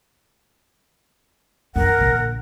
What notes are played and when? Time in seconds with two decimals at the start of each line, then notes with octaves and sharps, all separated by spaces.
1.76 F#2 A#4 F#5
1.99 A#1 D3